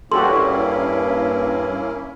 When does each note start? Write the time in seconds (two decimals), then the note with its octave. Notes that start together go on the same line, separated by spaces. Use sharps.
0.12 G2 A#3 C#4 E4 F#4 G4 A4 C6